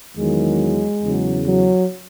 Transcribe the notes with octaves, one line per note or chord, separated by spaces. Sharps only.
E2 D#3 F#3 G#3
E2 C#3 F#3
F#3